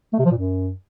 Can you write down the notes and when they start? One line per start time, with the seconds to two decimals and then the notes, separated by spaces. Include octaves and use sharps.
0.13 A3
0.19 C3
0.25 F3
0.31 A#2
0.37 F#2